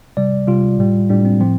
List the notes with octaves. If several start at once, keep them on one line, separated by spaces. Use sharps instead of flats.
C3 G3 D5
C3 G3 F4
A2 G3
A2 G3 D4
C4
A2 F3 C4